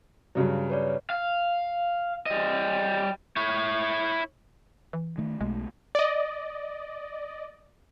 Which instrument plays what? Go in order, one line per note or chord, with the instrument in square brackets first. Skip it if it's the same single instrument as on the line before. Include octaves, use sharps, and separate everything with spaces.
[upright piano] G2 C#3 F#3
[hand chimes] B4 C#5 D5
[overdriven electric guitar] F5
G3 D#5
[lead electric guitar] E4 C#5
[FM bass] E3
[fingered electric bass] D#3 A3
[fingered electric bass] B1 B2 A3 [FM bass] G#3
[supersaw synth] D5 D#5